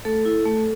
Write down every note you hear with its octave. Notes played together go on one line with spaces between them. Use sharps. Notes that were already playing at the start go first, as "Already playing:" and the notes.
A3 A4
E4
A3